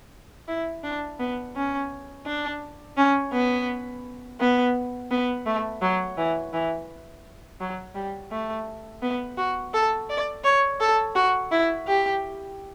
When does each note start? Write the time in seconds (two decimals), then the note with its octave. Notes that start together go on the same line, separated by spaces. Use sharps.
0.48 E4
0.83 D4
1.19 B3
1.55 C#4
2.26 D4
2.97 C#4
3.33 B3
4.40 B3
5.11 B3
5.46 A3
5.82 F#3
6.17 E3
6.53 E3
7.61 F#3
7.95 G3
8.31 A3
9.02 B3
9.38 F#4
9.74 A4
10.10 D5
10.44 C#5
10.80 A4
11.15 F#4
11.51 E4
11.87 G4